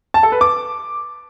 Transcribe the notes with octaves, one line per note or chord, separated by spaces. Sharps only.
A5
A4
B4
D6